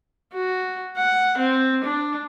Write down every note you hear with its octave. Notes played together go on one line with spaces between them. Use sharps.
F#4
F#5
C4
D4